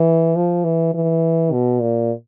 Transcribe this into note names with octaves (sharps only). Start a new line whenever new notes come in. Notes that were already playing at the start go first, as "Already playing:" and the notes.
Already playing: E3
F3
E3
E3
B2
A#2